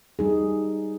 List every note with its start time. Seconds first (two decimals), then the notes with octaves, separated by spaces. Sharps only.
0.19 G3 D#4 G#4